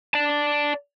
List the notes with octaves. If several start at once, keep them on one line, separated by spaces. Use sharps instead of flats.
D5 A5